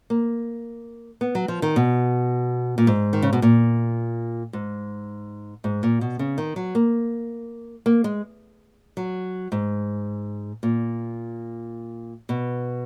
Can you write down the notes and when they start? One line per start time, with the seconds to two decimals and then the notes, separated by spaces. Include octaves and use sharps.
0.10 A#3
1.21 B3
1.35 F#3
1.48 F3
1.62 D#3
1.76 B2
2.78 A#2
2.87 G#2
3.13 D#3
3.22 C#3
3.33 B2
3.42 A#2
4.53 G#2
5.64 G#2
5.83 A#2
6.01 B2
6.19 C#3
6.38 D#3
6.56 F#3
6.75 A#3
7.86 A#3
8.04 G#3
8.97 F#3
9.52 G#2
10.63 A#2
12.29 B2